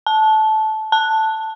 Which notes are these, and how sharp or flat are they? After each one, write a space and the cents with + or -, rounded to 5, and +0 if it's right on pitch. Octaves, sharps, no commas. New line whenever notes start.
A5 -15
A5 +5